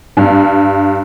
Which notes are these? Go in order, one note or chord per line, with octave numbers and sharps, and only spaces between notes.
G2